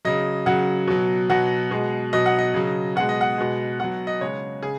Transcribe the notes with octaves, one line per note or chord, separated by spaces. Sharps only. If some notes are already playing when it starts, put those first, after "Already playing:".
C#3 F#3 D#5
C#3 F#3 F#5
B2 F#3
B2 F#3 F#5
B2 G#3
B2 F#3 D#5
F#5
D#5
C#3 F#3
B2 G#3 F#5
D#5
F#5
B2 G#3
B2 F#3 F#5
D#5
C#3 G#3 C#5
C#3 G#4